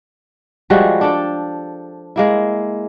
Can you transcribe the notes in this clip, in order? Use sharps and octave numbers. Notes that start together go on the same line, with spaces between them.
F3 G3 G#3 F#4
D4 A4 G5
G#3 A#3 E4